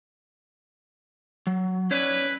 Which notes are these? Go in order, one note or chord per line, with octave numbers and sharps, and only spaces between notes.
F#3
C#4 E4 B4 C#5 D5